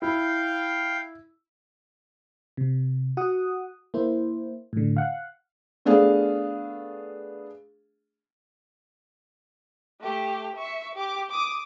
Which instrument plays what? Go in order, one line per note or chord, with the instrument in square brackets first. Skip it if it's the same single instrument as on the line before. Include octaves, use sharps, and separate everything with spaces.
[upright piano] E4 [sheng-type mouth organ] F5 G5
[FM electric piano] C3
F#4 F#5 D#6
A#3 E4 C5
A2 D3
F5 F#5
[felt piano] A3 B3 D4 G#4 F5
[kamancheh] A3 G4
E5 C#6
G4 D6
D6 D#6